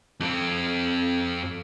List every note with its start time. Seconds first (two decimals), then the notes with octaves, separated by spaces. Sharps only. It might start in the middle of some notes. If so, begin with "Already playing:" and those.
0.20 F2 C4